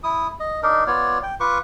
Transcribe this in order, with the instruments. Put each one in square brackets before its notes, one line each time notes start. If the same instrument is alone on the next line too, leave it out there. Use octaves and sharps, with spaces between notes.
[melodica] E4 D#6
D#5
D4 D#4 A#4
B3 F4 C#5 D5
G5
F4 B4 C#6 D6